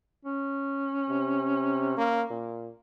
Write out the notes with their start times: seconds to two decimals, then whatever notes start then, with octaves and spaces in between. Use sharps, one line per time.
0.25 C#4
1.09 C3
1.97 A#3
2.30 A#2